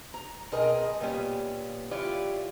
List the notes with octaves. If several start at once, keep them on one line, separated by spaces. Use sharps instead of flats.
A#5
B2 C4 G#4 A#4 D#5
A#2 G3 B3 C#4
E3 E4 F4 G4 C#5 D5